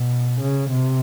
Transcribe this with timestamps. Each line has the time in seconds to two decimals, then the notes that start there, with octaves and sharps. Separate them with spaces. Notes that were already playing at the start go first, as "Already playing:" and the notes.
Already playing: B2
0.41 C#3
0.71 C3